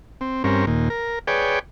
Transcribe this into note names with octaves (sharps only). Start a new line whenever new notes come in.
C4
G2 C4 C#4 A#4
D#2 A#2
A#4
G#4 B4 C#5 D5 G5